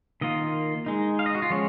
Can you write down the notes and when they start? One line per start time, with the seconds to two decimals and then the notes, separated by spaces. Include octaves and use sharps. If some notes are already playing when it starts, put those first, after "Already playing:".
0.21 D#3 A#3 F4 D#5
0.86 G#3 D#4
1.19 F5
1.26 D#5
1.35 F#4
1.42 F4
1.50 F3 G#3 C#4 C#5